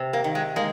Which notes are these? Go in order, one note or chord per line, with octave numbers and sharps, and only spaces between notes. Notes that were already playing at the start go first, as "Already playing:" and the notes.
Already playing: C3
A#3
D#3
G#3
G#3 A#3